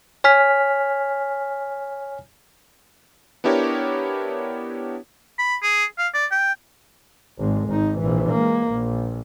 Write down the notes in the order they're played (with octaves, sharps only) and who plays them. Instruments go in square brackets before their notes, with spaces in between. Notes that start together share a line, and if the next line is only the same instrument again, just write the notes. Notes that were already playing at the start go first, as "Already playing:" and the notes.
[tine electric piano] C#5 G#5 F6 B6
[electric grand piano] B3 D4 E4 G4 A#4 C#5
[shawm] B5
G#4
F5
D5
G5
[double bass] G#1 G#3
G#1 D#4
A#1 E3
G#3 A#3
A#1